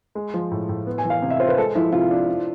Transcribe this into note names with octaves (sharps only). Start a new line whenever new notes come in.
G#3
F3
A2
A2
B3
G#5
E3
F5
C3
E5
F4 C5
B4
G#3 A4
F3 E4
C3 F4
D4
D4